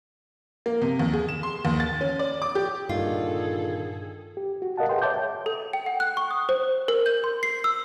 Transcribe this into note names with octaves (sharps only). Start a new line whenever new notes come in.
A#3
C3
D#2
G#4
E7
C6
D#2
A6
C#4
D5
D6
G4
G2 A#2 D3 D#3 F4 G#4 A4
G4
F#4
A#4 D#5 F5 F#5 A5
G#4 B4 G5 C6
C#5 E5 A5 D6 G6
A4
G5
F#5
F#6
C#6
D#6
C5
A#4
G6
C6
C7
E6